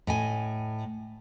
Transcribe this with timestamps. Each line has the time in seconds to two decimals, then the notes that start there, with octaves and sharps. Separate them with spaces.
0.07 A2 D#5 G#5